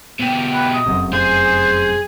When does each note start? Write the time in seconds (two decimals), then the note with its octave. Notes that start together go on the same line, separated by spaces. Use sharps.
0.20 B2 G4
0.53 B4
0.74 D#5
0.86 F1 F#2 C3
1.13 G#4 C5 G#5